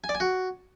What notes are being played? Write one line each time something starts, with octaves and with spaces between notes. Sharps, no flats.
G#5
D5
G#5
F#4